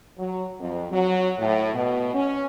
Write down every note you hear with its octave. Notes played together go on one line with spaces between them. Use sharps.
F#3
F2
F#3
A2
B2
C#4